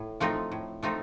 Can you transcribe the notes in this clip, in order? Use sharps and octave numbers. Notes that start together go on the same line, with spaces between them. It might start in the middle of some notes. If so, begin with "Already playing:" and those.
Already playing: A2
F3 A3 C4 D#4
A2
F3 A3 C4 D#4